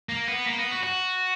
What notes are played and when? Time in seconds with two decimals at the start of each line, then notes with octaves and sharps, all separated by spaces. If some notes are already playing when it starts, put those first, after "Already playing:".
0.09 A#3
0.28 B3
0.46 A#3
0.58 B3
0.72 F#4
0.84 F#4